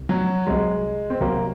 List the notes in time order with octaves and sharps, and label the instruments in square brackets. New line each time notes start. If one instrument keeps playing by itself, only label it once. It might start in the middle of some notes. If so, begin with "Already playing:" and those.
Already playing: [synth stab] C2
[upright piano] F#3
[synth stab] C2 C3 F#3 [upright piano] G#3
[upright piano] C4
[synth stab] C2 C3 F#3 [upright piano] A#3